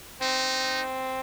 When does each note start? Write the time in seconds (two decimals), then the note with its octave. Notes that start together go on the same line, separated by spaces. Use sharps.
0.21 C4 D#4